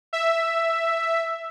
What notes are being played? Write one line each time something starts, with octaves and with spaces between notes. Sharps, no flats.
E5